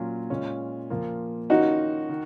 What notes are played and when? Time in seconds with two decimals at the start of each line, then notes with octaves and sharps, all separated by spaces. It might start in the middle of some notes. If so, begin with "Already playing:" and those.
Already playing: A#2 F#3 C#4 F4
0.30 A#2 G#3 C#4 F4
0.90 A#2 F3 A#3 F4
1.50 D#3 A#3 C#4 D#4 F4 F#4
2.10 D#3